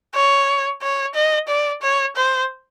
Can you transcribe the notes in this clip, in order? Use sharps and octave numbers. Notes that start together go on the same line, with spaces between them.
C#5
C#5
D#5
D5
C#5
C5